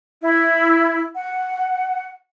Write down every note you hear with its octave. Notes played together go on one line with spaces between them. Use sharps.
E4
F#5